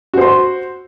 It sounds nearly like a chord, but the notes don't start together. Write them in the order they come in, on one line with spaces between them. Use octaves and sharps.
F#4 C5 C6